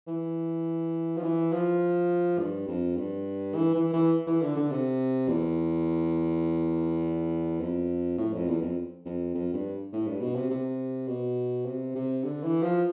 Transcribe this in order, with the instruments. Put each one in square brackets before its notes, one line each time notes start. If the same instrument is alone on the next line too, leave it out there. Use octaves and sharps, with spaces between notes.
[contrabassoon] E3
F3
E3
F3
G2
F2
G2
E3
E3
E3
E3
D3
D3
C3
E2
F2
A2
F2
E2
F2
F2
F2
G2
A2
G2
B2
C3
C3
B2
C3
C3
D3
E3
F3